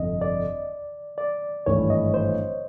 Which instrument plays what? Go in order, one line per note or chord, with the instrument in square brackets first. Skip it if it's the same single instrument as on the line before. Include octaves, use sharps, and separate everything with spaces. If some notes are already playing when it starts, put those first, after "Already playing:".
Already playing: [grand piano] G1 F2 C3 [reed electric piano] D#5
[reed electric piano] D5
D5
[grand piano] G#1 G2 E3 A3 [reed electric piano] C#5
[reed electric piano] D#5
C5